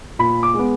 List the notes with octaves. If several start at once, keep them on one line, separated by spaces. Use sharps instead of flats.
A#2 B5
D6
G#3
B3